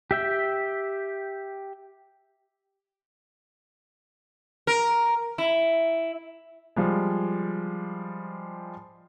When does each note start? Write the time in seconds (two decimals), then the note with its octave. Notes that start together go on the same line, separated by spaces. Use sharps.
0.11 G4 E5 G5
4.67 A#4
5.38 E4
6.76 F3 G3 G#3